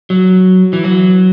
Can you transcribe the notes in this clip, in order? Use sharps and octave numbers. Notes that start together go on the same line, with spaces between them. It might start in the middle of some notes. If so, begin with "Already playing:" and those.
F#3
E3
F#3